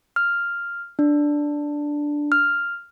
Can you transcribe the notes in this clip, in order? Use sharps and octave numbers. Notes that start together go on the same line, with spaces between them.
F6
D4
F6